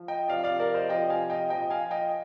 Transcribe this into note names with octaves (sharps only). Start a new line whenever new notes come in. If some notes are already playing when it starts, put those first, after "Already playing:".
Already playing: F3
D#5 G5
C3 F3 D5 F5
D5 F5
A#4 D5
C5 D#5
C3 F3 D#5 G5
F5 G#5
D#5 G5
A#2 F3 D#5 G5
F5 G#5
D#5 G5